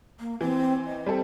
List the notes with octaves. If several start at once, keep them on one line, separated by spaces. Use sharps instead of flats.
A#3
E3 C4
D#5
G3 C4 A4